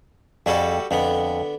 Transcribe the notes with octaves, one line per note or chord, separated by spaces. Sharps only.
F2 G3 F#4 G#4 A4
F2 D3 B3